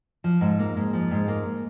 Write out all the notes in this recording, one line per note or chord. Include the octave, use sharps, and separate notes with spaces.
F3
G#2
A#3
G#2
F3
G#2
A#3